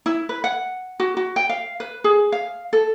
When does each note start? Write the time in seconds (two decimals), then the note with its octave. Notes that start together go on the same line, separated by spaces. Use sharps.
0.06 E4
0.29 B4
0.44 F#5
1.00 F#4
1.17 F#4
1.36 G5
1.49 F5
1.80 B4
2.04 G#4
2.32 F5
2.73 A4